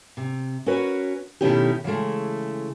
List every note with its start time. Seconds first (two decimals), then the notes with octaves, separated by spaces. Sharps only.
0.17 C3
0.66 C#4 F#4 A#4 B4 C#5
1.41 B2 D#3 A3 C#4 E4 G4
1.84 C#3 E3 G#3 A3